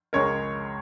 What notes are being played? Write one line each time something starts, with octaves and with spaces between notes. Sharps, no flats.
C#2 C#3 G#3 A#4 C#5